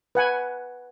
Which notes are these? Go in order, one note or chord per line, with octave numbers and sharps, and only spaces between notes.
B4 F#5 G#5